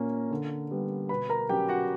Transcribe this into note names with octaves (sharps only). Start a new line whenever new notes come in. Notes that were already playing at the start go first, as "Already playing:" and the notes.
Already playing: A#2 A#3 C#4 A#4
D3
G3 B3
B2 B4 B5
A#4 A#5
F#3 C#4 G4 G5
F#4 F#5